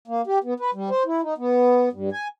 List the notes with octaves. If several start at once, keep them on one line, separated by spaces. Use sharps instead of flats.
A#3
G4
B3
B4
G3
C5
E4
D#4
B3
G2
G#5